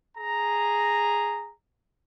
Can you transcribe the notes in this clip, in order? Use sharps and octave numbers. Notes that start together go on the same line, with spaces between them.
G#4 A#5